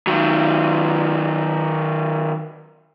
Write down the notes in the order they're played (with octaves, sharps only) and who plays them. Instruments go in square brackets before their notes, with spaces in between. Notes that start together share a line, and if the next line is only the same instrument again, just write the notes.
[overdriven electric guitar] D#3 F#3